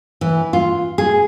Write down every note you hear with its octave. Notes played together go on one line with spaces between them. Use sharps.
E3
F4
G#4